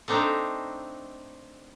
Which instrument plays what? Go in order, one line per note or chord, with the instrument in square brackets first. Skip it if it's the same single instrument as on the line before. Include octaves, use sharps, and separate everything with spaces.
[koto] A3 C4 D4 D#4 C5 A#5